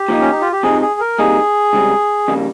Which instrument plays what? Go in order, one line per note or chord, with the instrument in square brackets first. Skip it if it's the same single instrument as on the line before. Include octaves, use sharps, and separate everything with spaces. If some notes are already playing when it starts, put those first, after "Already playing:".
Already playing: [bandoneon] G4
[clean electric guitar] A#2 F3 A#3 D#4
[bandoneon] C#4
D#4
F4
G4
[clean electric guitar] C3 F3 C4 D#4 [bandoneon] G#4
[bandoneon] G#4
A#4
[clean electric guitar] C3 G3 A#3 D#4 [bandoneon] G#4
[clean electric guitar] C#2 C#3 G3 C4
F2 C#3 G3 A#3